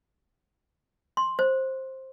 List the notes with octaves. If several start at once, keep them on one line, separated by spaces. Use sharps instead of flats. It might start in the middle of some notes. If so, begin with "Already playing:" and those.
C6
C5